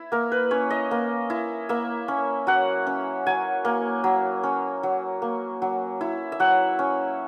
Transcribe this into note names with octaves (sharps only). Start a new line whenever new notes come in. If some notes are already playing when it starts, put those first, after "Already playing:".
Already playing: E4
A#3 A#4
B4
C#4 C#5
D#5
A#3
E4
A#3 E5
C#4
F#3 F#5
C#4
F#3 G#5
A#3
F#3
C#4
F#3
A#3
F#3
E4
E5
F#3 F#5
C#4